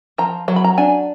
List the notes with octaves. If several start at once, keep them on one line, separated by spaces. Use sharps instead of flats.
F3 A#5
F#3 A#5
B5
A#5
D4 G#5